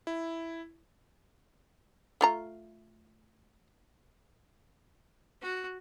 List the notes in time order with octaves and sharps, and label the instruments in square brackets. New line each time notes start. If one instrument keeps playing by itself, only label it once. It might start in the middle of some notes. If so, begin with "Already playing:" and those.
[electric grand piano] E4
[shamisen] A3 F4 A#5
[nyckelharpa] F#4